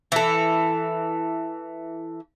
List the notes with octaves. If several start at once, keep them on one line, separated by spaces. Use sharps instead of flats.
E3 A4